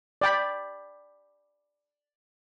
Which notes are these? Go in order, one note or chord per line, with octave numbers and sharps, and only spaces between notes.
D5 G5 B5